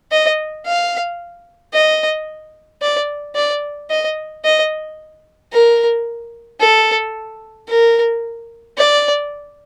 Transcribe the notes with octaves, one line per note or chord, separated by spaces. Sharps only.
D#5
F5
D#5
D5
D5
D#5
D#5
A#4
A4
A#4
D5